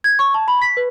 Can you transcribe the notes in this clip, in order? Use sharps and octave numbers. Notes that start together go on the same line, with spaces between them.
G#6
C#6
A5
B5
B6
B4